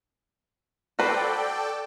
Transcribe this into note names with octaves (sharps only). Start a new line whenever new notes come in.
F#4 A4 B4 C5 D5 G5